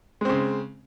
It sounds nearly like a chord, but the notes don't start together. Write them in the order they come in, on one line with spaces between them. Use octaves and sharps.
G#3 C4 C#3